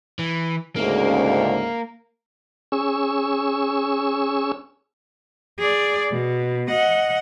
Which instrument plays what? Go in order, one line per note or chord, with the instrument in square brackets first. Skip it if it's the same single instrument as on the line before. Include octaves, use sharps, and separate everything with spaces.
[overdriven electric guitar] E3
[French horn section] D2 G#2 C#3 [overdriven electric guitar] A#3
[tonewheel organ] C#4 G#4 C#6 E6
[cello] G#4 D5
B2
D#5 F#5